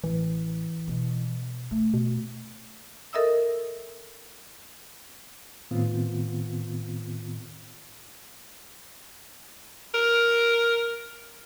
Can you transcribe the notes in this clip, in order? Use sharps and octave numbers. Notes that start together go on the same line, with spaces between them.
A1 E3
B2
A3
B2
A4 A#4 D#5 E5 D#6 E6
A2 D#3 B3 C4 F4
A#4